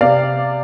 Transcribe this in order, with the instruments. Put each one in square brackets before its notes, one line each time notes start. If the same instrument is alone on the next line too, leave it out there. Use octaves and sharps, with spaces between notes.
[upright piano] C3 D5 F5